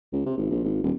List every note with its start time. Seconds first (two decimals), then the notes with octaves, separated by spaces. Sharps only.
0.13 C#2
0.26 C3
0.37 G#1
0.50 A#1
0.64 G#1
0.83 D#1